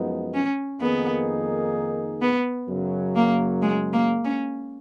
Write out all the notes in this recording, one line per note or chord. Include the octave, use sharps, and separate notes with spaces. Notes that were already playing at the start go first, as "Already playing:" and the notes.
Already playing: F#2 F3 G#3 B3 D#4
C#4
F2 D#3 A#3 B3 D#4 G#4
B3
F#2 C#3 F#3
A#3
G#3
A#3
C#4